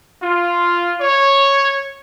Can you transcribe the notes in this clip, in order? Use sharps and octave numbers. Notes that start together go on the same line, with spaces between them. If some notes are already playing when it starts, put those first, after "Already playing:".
F4
C#5